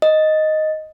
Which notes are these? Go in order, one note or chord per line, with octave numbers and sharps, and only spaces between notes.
D#5